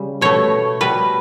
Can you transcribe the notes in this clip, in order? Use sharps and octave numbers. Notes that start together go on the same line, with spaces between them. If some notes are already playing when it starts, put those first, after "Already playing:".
Already playing: C#3 G3
B2 A3 C#5
B2 G3 B4